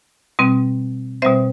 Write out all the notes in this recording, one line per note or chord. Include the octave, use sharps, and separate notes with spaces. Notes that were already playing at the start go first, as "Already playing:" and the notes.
B2 G3 C4
B2 G3 C4 C5 E5